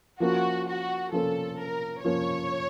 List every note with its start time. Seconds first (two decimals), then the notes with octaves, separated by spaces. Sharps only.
0.20 F3 A#3 C#4 F4 F#4 A#4
0.67 F#4
1.12 F3 A#3 C#4 F4 A4 A#4
1.59 A#4
2.05 F3 A#3 C#4 F4 A#4 C#5